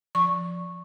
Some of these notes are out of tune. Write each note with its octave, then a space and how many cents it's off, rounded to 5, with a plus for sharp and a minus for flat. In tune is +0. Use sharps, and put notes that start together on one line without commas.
F3 +0 C#6 -10